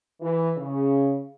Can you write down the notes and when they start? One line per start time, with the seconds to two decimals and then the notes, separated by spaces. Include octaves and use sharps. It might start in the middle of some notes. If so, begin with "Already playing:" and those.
0.21 E3
0.57 C#3